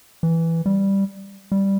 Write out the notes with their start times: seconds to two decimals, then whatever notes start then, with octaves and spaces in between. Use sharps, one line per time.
0.23 E3
0.66 G3
1.52 G3